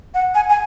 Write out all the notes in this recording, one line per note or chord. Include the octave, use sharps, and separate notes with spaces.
F#5
G#5
G#5